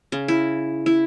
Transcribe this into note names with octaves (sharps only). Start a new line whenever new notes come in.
C#3
E4
E4